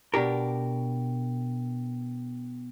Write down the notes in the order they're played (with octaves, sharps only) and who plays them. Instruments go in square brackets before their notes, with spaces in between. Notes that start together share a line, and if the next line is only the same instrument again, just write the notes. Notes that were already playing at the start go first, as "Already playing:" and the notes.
[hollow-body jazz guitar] B2 D4 G4 A#4